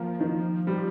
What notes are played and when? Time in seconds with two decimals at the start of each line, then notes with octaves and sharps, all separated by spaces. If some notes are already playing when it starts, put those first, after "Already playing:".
Already playing: F3 A#3
0.21 D#3
0.67 G3